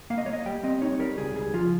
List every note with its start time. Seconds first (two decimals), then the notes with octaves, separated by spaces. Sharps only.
0.10 A#3 F5
0.18 D#5
0.26 A#3 C#5
0.33 D#5
0.46 G3 G5
0.63 C4 D#5
0.82 D#4 C#5
0.99 G3 A#4
1.17 C#2 G#4
1.35 C#2 G#4
1.54 F3 F4